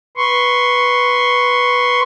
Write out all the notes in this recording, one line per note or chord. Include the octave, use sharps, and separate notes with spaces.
B4 C6 C#6